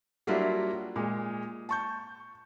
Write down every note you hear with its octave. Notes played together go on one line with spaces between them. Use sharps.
F#3 G3 A#3 D4 E4 F4
A#2 G#3
A5 C#6 G6